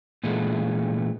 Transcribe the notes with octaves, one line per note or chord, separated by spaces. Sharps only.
A#2 E3 G#3 A3 D4